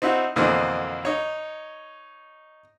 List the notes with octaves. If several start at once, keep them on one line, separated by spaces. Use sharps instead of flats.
C4 D#4 E4 F#4
F2 B2 D3 E3 A#3 C4
D#4 C#5